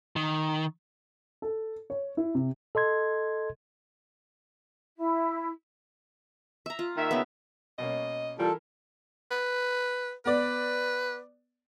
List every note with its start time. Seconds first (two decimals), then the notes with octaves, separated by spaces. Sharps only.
0.16 D#3
1.42 A4
1.90 C#5
2.17 E4
2.35 C3
2.75 A4 D#5 C6 G#6
4.97 E4
6.66 E5 A#5
6.79 F4
6.97 D#3 A#3 E5
7.11 C#3 B3
7.78 B2 A#3 C#4 D#5
8.39 E3 G3 F4 A4 A#4
9.31 B4
10.25 B3 B4 D5